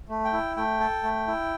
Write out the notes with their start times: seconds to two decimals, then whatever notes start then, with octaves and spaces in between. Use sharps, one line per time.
0.09 A3
0.25 G5
0.33 E4
0.57 A3 G5
0.80 A4
1.03 A3
1.28 E4